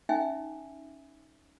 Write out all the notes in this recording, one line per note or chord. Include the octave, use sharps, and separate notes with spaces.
C#4 D#4 E5 G5 G#5